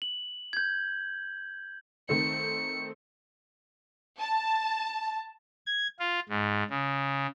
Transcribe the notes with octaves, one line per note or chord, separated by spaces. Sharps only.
F#7
G6 G#6
D#3 A3 C4 C#7
A5
G#6
F4
G#2
C#3